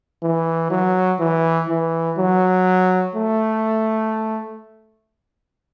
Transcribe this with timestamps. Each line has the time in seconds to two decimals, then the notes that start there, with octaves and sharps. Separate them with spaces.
0.23 E3
0.71 F#3
1.20 E3
1.69 E3
2.19 F#3
3.16 A3